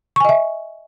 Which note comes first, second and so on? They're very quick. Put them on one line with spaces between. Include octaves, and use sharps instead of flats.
C#6 G#5 D#5 E5